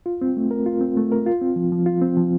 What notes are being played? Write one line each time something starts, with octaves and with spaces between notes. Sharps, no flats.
F4
C4
A3
A#4
F4
C4
A3
A#4
F4
C4
F3
F3
F4
C4
F3